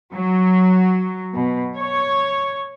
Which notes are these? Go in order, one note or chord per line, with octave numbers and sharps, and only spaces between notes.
F#3
B2
C#5